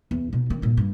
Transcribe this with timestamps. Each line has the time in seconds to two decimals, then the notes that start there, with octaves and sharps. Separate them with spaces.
0.11 E2
0.33 B2 D#4
0.50 D#3 C4
0.62 G2 A#2
0.77 G2